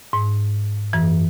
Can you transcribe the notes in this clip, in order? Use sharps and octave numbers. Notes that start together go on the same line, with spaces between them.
G#2
F#2 E3